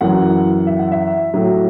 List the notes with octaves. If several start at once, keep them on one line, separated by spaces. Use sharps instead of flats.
F#2 E3 F#5
E5
F#5
E5
A2 F#3